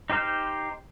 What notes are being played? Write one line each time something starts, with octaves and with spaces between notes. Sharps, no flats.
D#4 G4 C5 F6 G6